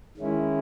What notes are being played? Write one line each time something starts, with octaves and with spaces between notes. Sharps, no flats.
D#3 G#3 C#4 E4